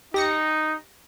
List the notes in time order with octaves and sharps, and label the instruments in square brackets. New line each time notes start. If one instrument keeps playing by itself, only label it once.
[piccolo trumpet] D#4 [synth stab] G4 A#6 C#7